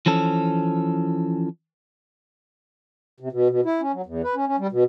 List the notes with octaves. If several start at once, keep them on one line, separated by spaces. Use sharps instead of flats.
E3 F3 C#4 A4
C3
B2
B2
E4
C#4
F#3
E2
B4
C#4
C#4
G3
B2